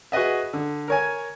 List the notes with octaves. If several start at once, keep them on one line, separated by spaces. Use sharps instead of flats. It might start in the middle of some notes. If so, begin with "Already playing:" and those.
F#4 G#4 B4 D#5 E5
D3
A#4 C#5 G#5